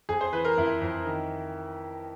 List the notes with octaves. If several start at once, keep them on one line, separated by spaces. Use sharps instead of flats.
F2 G#4
C5
E3 B4
A#4
F2 E4
F2
D#3